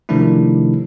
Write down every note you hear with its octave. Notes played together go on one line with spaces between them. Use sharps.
C3 D#3 F3 A3 D4 E4